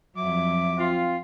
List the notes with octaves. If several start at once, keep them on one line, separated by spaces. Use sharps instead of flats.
F2 F#3 E5 D6
C4 F4